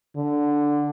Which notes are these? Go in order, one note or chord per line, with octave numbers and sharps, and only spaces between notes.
D3